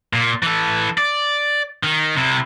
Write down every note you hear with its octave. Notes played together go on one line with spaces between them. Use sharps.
A#2
E3 A4
D5
D#3
C3 E4